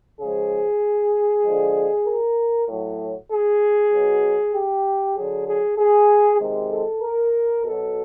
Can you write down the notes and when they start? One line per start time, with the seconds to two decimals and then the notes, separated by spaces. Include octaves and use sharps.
0.20 C#3 F3 G#3 G#4
1.45 D3 F3 G#3
2.06 A#4
2.69 A2 F#3
3.31 G#4
3.93 B2 F#3
4.53 G4
5.16 D3 F#3 G#4
5.47 G#4
5.78 G#4
6.40 C3 D#3 G#3
6.70 A4
7.02 A#4
7.64 B2 F#3 A4